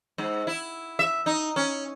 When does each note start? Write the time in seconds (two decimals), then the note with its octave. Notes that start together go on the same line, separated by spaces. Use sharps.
0.18 G#2
0.47 E4
0.99 E5
1.26 D#4
1.56 C#4